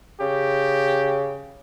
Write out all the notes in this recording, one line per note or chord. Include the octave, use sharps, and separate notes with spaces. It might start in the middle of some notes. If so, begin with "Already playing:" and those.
C#3 G4